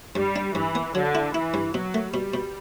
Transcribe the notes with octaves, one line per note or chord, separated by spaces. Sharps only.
G2 G3
D4
G2 E3
B3
D3 F#3
E4
E3 E4
G2
B2 F#3
A3
B2 G3
B2